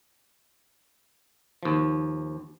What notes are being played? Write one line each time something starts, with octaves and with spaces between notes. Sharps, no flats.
D#2 F3